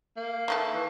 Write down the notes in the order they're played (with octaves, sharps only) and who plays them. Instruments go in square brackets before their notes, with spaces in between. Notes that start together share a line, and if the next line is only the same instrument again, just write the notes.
[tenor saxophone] A#3
[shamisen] D#3 A3 A4
[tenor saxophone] E3